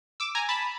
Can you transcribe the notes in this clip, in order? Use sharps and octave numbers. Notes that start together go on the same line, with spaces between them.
D6 E6
G#5 A#5
A5 B5